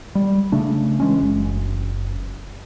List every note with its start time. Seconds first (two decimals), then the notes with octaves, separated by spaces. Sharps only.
0.15 G3
0.52 C#3 A3 D4
1.00 E3 G#3 C#4
1.22 F#1